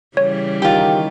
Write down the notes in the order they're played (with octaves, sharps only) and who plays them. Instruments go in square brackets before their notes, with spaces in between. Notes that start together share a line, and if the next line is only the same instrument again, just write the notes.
[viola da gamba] C#3 E3 G3 [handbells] C#5
[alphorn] D#3 [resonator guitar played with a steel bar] F4 G4